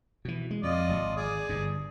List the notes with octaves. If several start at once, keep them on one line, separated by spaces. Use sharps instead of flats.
B2 E3
G#3
F2 F4 D5 D#5
D1 G#1
G#4 D5
G1 G2